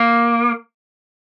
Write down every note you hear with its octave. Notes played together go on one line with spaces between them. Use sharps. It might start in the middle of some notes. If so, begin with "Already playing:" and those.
Already playing: A#3